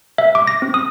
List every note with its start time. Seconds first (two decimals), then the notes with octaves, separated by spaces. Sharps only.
0.18 E5
0.35 D6
0.47 A#6
0.62 C4
0.74 D#6